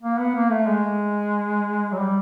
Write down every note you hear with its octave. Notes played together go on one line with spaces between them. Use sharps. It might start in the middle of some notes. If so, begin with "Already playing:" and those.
A#3
B3
A#3
A3
G#3
F#3
G3